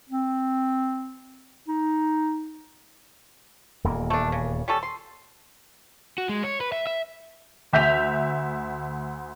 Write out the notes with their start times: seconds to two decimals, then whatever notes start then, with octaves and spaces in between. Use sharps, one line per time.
0.10 C4
1.68 D#4
3.84 D#1 E2 A#3
4.10 A3 D4
4.32 C#3
4.68 G3 C#4 A4
4.83 C6
6.18 F#4
6.29 G#3
6.44 C#5
6.61 B4
6.72 E5
6.87 E5
7.73 D2 E5 G6 B6 F7